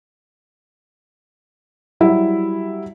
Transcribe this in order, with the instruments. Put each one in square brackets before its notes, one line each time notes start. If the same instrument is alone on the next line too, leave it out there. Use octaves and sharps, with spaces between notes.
[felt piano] F#3 G3 E4